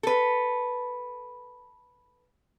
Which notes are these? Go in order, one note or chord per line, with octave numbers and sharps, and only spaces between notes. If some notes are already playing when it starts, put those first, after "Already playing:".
A4 B4